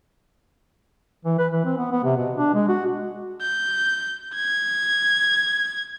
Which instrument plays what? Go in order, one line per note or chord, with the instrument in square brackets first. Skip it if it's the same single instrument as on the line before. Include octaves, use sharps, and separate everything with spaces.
[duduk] E3
B4
E3
C4
B3
B3
C3
B2
D4
G#3
F#4
[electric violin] G6
G#6